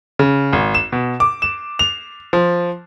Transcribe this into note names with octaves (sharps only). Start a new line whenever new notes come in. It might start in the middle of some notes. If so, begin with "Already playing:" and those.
C#3
G#1
E7
B2
D6
E7
F7
F3